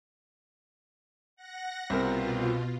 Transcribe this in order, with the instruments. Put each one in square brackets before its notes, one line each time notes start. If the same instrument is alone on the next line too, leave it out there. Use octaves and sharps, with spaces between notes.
[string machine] F#5 A#6
[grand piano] C2 C4 A#4 [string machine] B2 F4